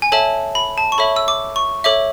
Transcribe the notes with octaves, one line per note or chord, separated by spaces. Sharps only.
G#5
A4 C#5 E5 A5
B5
A5
C#6
A4 C#5 E5 B5
E6
D6
C#6
A4 C#5 E5 D6